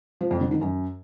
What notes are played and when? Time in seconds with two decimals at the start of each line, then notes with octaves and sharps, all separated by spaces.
0.21 F3
0.31 F2
0.41 D3
0.51 D#3
0.61 F#2